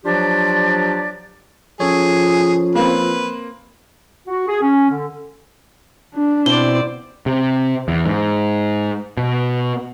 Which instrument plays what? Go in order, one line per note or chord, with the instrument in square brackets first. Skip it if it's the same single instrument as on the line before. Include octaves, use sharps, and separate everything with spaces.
[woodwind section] F3 F#3 D4 F4 G4 D5
[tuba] F3 [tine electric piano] C#4 A4 C#5 [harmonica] G#4
[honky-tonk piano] A#3 C4 [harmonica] B4
[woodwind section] F#4
G#4
C#4
D3
[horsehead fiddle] D4
[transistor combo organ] B2 C4 E4 [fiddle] C5 D5 [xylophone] G7
[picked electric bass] C3
E2
G#2
B2